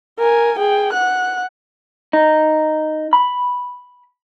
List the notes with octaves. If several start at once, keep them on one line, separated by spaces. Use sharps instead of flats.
A#4 G#5
G#4 G5
F#5 F#6
D#4
B5